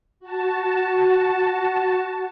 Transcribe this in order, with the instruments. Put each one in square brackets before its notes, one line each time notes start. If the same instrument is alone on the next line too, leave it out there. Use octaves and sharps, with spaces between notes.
[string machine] F#4 A5